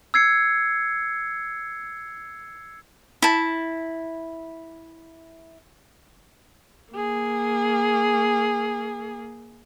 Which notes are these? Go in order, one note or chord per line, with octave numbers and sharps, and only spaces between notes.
E6 G#6 C7 C#7
E4 A5
A#3 G#4